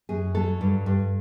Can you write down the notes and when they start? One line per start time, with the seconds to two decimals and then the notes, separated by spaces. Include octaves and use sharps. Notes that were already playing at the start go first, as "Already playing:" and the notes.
0.09 F#2 G#4
0.34 F#3 A4
0.61 G2
0.86 G2